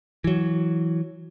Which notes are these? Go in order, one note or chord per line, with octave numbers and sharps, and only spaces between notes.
E3 F#3